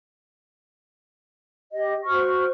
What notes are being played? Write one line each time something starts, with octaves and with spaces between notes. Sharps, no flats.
G4 D#5
F#4 C5 C#6 F6